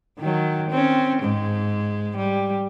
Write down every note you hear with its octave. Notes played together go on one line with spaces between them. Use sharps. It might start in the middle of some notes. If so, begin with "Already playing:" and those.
D#3 F#3
C4 C#4
G#2 G#3
G3